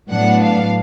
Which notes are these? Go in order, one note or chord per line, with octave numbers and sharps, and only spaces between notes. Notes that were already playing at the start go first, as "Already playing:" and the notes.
A2 F#3 B3 D4 F#5
F5